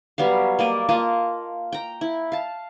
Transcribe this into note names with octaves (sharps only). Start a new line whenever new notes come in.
F#3 G3 B3 F5
A#3 D5 D#5
A#3 F4 D#5 A5
G5 A#5
E4
F5 A5